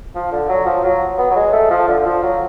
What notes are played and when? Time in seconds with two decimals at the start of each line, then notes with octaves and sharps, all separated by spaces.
0.15 F3
0.31 D3
0.49 F#3
0.66 F3
0.84 F#3
1.18 B3
1.31 F#3
1.36 G#3
1.53 A3
1.71 F3
1.88 D3
2.06 F3
2.23 F#3